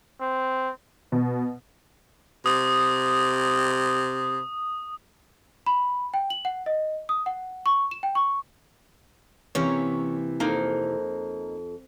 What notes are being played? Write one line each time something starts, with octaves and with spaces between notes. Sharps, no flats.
C4
B2
C3 D#6
B5
G5
F#7
F#5
D#5
D#6
F#5
C#6
E7
G5
C#6
C3 E3 A#3 C#4 C#5
F2 A#3 D#4